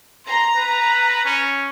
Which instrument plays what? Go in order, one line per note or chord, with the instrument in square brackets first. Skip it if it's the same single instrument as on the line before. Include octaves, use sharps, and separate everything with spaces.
[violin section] A#5 [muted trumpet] C6
[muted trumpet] B4
C#4